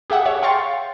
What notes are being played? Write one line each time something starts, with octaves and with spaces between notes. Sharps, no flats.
G4 G#4 E5 F#5
G#4 C#5 E5
F5 G5 C6 C#6 A6